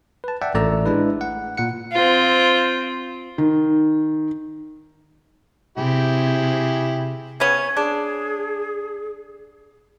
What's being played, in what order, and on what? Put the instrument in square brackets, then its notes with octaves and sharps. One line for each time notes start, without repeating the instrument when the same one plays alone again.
[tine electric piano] B4 A5
D5 E5 F#5 G5 A5
A1 A3 D5 A#5 E6
G#3 D4 E4 B4
F#5
A#2 F#5 C#7
[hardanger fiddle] C4 F4
[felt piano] D#3
[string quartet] C3 [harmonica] E4 G4 G#4
[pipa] C#3 B3 C#4 [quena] G#6
[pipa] D4 [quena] G#4